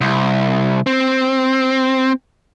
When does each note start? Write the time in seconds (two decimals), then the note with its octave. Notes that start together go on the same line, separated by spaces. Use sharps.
0.01 C2
0.87 C4